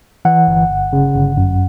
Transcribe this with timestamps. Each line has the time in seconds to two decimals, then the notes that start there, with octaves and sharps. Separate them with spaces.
0.25 E3 F#5
0.48 G1
0.70 G1
0.93 C#3
1.15 G1
1.37 F#2